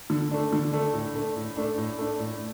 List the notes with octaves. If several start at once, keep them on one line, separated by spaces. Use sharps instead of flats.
D3
A3 D4
D3
A3 D4
A2
A3 D4
A2
A3 D4
A2
A3 D4
A2